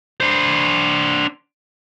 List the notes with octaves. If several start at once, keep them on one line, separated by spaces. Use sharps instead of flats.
D4 C5